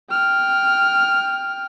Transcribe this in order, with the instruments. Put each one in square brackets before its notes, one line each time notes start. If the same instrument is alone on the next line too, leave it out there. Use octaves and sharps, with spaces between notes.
[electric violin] G5 F6